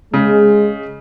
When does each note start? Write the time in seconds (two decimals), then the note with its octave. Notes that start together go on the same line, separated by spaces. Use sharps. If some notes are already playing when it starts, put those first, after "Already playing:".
0.14 C#3 G#3